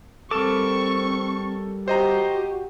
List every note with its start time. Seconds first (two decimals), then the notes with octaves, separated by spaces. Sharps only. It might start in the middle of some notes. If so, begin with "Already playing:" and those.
0.31 G3 C4 A4 A#4 C#6 D6 E7
1.88 F#4 G4 C5 D#5 A#5